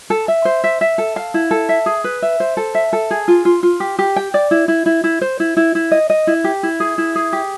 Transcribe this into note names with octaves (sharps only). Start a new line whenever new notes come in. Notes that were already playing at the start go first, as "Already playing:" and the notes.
A4
E5
C5
E5
E5
A4
F5
E4
A4
E5
G#4
B4
E5
C5
A4
E5
A4
G#4
F4
F4
F4
G4
G4
G5
D5
E4
E4
E4
E4
C5
E4
E4
E4
D#5
D#5
E4
G4
E4
G#4
E4
G#4
G4